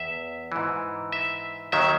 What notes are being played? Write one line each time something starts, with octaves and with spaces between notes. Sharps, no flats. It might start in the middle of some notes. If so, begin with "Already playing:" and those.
Already playing: E2 E5
G#2 E3
E5
D#2 D#3 F#3 E5